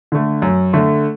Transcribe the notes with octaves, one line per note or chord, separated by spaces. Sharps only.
D3 A3
F#2
D3 A3